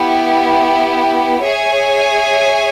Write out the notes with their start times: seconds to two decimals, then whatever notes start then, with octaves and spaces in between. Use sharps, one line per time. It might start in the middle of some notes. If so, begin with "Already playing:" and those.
Already playing: B3 E4 G4
1.43 G#4 C#5 E5 G#5